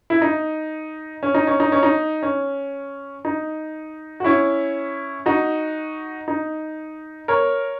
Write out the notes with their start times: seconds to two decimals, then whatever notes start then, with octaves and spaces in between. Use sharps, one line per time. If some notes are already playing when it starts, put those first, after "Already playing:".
0.10 E4
0.22 D#4
1.23 C#4
1.35 D#4
1.47 C#4
1.60 D#4
1.72 C#4
1.83 D#4
2.23 C#4
3.25 D#4
4.20 F#4
4.24 C#4 E4
5.26 D#4 F#4
6.28 D#4
7.28 A#4 C#5